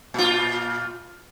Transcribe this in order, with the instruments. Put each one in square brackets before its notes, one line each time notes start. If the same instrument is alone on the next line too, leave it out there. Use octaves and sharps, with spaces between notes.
[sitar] A#2 F4